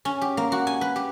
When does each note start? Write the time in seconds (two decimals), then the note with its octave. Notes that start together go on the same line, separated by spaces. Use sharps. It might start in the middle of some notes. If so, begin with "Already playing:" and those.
0.05 C#4
0.22 G4
0.37 A#3
0.52 F#4
0.67 G#5
0.81 B4
0.96 G4